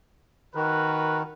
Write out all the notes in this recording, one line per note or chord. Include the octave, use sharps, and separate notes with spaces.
D#3 F#4 A#4 B4